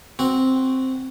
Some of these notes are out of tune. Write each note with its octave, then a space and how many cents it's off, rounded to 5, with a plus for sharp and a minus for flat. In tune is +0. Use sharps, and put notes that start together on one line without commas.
C4 +0 F#4 +0